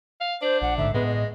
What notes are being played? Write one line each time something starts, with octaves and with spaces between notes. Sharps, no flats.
F5
D4 C5
A#1 F#5
A1 G#2 D3 E5
A2 G#3 B3 B4
D#5